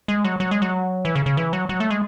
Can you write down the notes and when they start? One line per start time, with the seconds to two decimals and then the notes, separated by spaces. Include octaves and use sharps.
0.08 G#3
0.24 F#3
0.40 F#3
0.51 G#3
0.62 F#3
1.05 E3
1.15 C#3
1.26 C#3
1.37 E3
1.53 F#3
1.69 F#3
1.80 A3
1.90 G#3